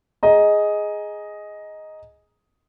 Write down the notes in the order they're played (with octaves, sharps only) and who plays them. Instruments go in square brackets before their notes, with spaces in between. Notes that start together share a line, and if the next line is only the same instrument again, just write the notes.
[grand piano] G#4 D#5 A#5